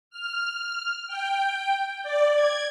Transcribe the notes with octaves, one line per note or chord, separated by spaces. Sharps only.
F6
G5
D5
G#6